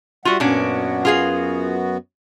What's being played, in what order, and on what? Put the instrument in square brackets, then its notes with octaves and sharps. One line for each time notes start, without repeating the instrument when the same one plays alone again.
[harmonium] G3 E5 F#5 [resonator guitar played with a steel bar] F4 F#4
[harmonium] F#2 B3 F#4 [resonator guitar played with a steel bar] A#2 C#4 D4
[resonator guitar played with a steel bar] F4 G#4 F5